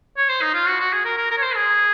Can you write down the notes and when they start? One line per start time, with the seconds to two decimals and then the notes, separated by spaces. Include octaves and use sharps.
0.17 C#5
0.29 C5
0.42 D#4
0.54 F4
0.68 F#4
0.80 F#4
0.93 G#4
1.05 A#4
1.17 A#4
1.31 A#4
1.38 C#5
1.42 C5
1.56 G#4